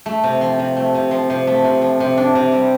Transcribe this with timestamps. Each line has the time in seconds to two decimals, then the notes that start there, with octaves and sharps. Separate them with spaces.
0.06 A3
0.24 C3
0.41 F3
0.59 C3
0.77 A3
0.95 C3
1.11 F3
1.30 C3
1.47 A3
1.65 C3
1.82 F3
2.00 C3
2.17 D4
2.35 C3
2.52 G3